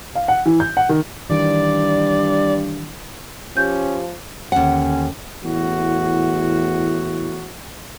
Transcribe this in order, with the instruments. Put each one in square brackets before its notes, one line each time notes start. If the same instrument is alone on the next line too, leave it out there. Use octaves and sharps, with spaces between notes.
[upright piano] F5
F#5
E3
G6
F#5
D#3
[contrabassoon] G2 [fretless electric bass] D#3 E3 [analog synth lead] D5
[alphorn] F3 [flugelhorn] C#4 [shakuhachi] G4 [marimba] G6
[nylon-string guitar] D#2 F#5 [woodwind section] D3 C#4
[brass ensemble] E2 A2 F#4